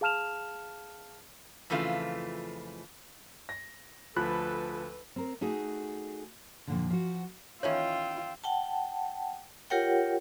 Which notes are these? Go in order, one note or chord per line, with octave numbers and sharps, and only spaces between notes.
G#4 F5 A5 F6 E7 F7
F2 C#3 E3 A3 F4
A#6
D2 F3 A4 B4 B5 F#6
C4 A#4
A3 D#4 F#4 G#4
F2 A#2 D3
F3 F#4
D#3 E3 C#4 F4 C#5 G5 E6
F#5 G5 A5
F4 G4 A#4 C#5 F#5 G5